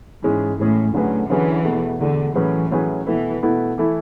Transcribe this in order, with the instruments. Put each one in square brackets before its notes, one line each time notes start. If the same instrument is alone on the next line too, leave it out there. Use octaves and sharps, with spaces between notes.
[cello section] G#2 [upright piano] E3 G#3 C#4 G#4
[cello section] A2 [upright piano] E3 G#3 C#4 G#4
[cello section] A2 [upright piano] D3 F#3 C#4 G#4 B4
[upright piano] D3 F#3 C#4 G#4 B4 [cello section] E3
[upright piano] E2 B2 A3
[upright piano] E2 B2 A3 [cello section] D3
[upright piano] A2 F#3 C#4 G#4 B4 [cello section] E3
[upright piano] A2 F#3 C#4 G#4 B4
[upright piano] B2 A3 E4 B4 [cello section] E3
[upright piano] B2 A3 E4 B4
E3 A3 E4 A4